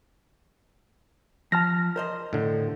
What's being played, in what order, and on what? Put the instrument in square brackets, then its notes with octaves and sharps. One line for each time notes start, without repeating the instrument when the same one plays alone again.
[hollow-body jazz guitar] F3 [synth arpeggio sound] A5 F6 A#6
[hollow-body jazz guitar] A#4 C5 D#5
[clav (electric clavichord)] A2 D3